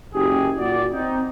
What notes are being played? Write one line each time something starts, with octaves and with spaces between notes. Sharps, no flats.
F#1 G4 G#4
A#2 F#4 D5
C4 D#4